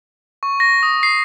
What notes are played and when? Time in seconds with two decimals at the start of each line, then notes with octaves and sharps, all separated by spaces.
0.43 C#6
0.60 A#6
0.83 D#6
1.03 C7